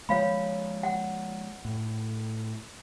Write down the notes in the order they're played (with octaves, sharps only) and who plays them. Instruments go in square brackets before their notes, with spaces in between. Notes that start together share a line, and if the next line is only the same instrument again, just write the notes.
[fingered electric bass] F3 G#3 [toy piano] C#5 F5 B5
[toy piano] F#5
[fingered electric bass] A2